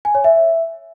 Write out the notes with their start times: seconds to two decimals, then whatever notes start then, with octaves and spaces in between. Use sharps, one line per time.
0.05 G#5
0.15 C#5
0.24 E5